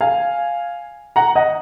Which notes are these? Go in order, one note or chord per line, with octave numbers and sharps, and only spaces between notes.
F5 G#5
F#5 A#5
D#5 F#5